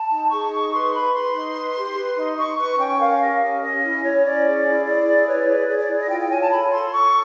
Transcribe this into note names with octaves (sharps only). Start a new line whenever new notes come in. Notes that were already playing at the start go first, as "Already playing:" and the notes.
Already playing: A5
D#4
G#4 C#6
D#4
B4 C6
B4 B5
B4 C6
D#4
B4
G4
B4
D#4
D#4 C#6
B4 C#6
C#4 G5
A#4 F5
G4 D#5
C#4 D#5
C#4 D#5
E4
E4 C#5
C#4 D5
G#4
E4
G#4 D5
E4
B4 C#5
G#4 D5
G#4 D5
D5
E4
D#5
F4 G5
G5
C#5 G#5
A5
A4 B5
A4 C6
A4 C#6